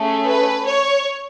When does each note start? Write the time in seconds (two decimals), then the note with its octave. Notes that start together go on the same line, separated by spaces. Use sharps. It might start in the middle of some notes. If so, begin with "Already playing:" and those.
Already playing: A3 C#4 G#4
0.27 B4
0.66 C#5